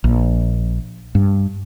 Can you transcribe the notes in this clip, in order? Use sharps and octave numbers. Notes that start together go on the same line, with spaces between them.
A#1
G2